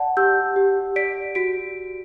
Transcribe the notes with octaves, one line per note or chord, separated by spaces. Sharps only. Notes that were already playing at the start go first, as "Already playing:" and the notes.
Already playing: D5 F#5 A5
G4 E6 G6
G4
D5 B6 D7
F#4 B6 D7